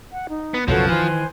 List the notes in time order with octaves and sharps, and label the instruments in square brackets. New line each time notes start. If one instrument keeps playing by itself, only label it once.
[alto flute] F#5
D#4
[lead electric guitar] B3
[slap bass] B1 F#2 C#3 [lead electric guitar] F3 [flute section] F#4 A4 C#5 [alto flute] B4
[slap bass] D#3 E3 [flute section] C5 G#5